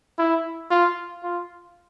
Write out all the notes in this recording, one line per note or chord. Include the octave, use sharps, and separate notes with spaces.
E4
F4
F4